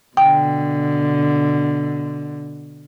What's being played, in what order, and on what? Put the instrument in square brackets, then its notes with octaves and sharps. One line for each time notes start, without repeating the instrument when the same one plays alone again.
[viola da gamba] B2 D3 [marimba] G5